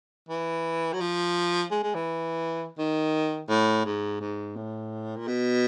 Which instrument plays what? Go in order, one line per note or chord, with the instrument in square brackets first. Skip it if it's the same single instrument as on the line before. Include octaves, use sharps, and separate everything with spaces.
[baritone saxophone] E3
F#3
F3
G#3
G#3
E3
D#3
A2
G#2
G#2
A2
A#2
B2